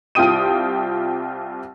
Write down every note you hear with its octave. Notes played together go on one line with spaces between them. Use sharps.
C2 F4 G4 G5 D#6 D#7